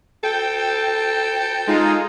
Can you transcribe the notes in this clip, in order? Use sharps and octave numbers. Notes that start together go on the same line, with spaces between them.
A4 G5
G#3 D#4 F4